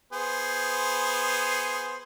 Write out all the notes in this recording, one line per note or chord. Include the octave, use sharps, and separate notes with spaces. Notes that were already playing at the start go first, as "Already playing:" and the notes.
B3 G#4 C5